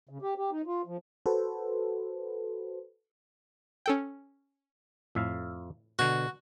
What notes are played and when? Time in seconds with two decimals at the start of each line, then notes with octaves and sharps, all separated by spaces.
0.09 C#3
0.22 G4
0.38 G4
0.51 D#4
0.67 F4
0.87 F3
1.26 F#4 A4 B4 C5
3.86 C#4 A4 G5
5.15 F2 A2 E5 F5
5.99 B2 D3 F#4